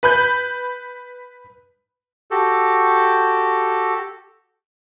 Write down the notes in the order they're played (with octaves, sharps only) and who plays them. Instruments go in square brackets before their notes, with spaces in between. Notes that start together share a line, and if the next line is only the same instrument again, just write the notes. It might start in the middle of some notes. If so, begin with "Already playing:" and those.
[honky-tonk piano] B4 B5 G6
[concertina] F#4 G4 A4